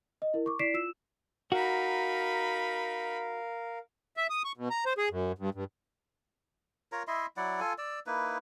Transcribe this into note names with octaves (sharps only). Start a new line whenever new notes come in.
D#5
E4 A#4
C#6 D6
E4 D5 B6 C7 D7 E7
F4 E6 E7
D#4 F#4 A#4 F5 B5
E5
D#6
C#6
B2
A#5
C5
G#4
F#2
G2
G2
F4 A#4 C#5 A#5
E4 D#5 E5 C6
F#3 E4 D5 F#5
F4 A4 G#5
D5 E6
A#3 D#4 E4 B4